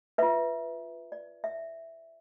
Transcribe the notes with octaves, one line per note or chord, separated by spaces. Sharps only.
F4 B4 E5
D5
E5